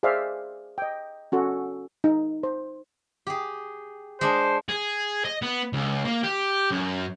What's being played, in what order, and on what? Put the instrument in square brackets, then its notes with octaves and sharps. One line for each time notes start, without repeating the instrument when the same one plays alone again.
[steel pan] G#4 C5 D5 E5 F5
D#5 G5
C#4 F#4 A4
D#4
C5
[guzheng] G4 G#4
[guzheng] G#3 D4 D#5 [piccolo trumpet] C5
[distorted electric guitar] G#4
D#5
B3
C#2
A#3
G4
F#2